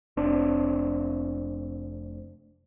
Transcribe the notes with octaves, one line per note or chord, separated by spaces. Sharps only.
F1 C4 D4